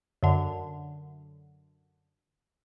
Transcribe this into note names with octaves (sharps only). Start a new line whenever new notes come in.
F#2 D3